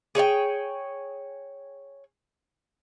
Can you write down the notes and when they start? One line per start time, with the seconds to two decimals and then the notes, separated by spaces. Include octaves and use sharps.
0.15 G#4 C#5 D#5 G5